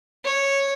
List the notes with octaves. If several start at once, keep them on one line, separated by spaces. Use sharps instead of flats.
C#5